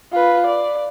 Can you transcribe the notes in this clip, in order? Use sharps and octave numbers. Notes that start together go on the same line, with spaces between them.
F4 B4
D5